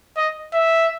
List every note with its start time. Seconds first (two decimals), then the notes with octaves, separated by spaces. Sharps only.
0.17 D#5
0.54 E5